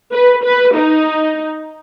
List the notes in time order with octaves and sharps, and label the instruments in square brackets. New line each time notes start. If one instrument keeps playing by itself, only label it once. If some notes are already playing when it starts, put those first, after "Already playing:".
[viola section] B4
B4
D#4